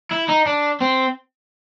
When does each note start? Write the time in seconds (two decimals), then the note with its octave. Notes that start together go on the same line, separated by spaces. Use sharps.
0.11 E4
0.28 D#4
0.46 D4
0.81 C4